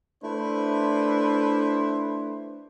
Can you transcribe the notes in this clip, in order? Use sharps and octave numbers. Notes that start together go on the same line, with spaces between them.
A3 D4 E4 B4 C5